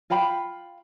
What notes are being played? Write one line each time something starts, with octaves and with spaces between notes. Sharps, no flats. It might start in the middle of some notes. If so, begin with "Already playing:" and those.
F4 F5 G5 B5